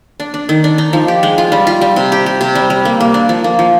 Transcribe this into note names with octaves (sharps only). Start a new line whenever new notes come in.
D4
D4
D#3
D4
D#4
F3
G4
G#3
F4
G3
F4
G3
C3
G4
G4
C3
G3
G3
A#3
A#3
D4
F3
A#3
F3